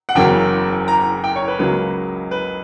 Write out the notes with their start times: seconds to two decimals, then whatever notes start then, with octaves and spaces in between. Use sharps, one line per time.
0.09 F#5
0.15 F#1 E2 C#3 F#3 A#3 G5
0.88 A#5
1.24 G5
1.36 C#5
1.48 B4
1.59 C#2 C#3 F#3 A#3 B4
2.31 B4